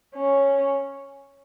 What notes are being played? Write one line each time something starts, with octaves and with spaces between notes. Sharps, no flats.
C#4